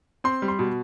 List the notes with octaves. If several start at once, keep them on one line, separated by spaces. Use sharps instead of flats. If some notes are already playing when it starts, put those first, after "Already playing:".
C4 C6
G3
C6
B2